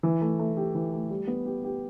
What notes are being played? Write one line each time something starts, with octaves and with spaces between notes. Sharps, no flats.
E3
A3
A3
G4
E3
A3
G3
B3
G4
G4